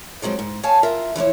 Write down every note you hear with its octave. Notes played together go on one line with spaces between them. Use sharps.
F3 F#3 G#3 C4
G#2
C#5 F5 G#5 A5
F4 A#4 E5
E3 F3 E4 C#5